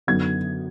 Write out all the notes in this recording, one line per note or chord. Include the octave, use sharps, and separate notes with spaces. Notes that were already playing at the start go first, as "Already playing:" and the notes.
F#2 D3 F#3 B3 D#4 G#6